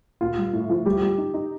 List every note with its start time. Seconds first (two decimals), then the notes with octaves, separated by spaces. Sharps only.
0.21 A#2 F4
0.38 G3
0.53 A2
0.70 F3
0.85 G3 G4
1.01 G3
1.18 D#4
1.34 D#4